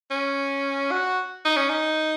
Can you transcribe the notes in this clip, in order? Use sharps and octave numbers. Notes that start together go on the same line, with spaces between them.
C#4
F#4
D#4
C#4
D#4